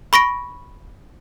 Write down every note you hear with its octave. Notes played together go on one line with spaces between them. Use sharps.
B5 C#6 A#6 D7